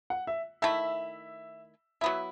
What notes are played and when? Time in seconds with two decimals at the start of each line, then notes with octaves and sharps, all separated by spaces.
0.10 F#5
0.27 E5
0.62 D#3 A3 E4 E5
2.01 F#3 B3 E4 E5